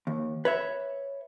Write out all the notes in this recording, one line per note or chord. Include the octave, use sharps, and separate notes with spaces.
D#2
B4 C#5 E5